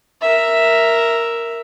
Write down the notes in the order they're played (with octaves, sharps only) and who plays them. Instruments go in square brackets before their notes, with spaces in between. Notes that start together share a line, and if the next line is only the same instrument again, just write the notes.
[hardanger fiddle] A#4 E5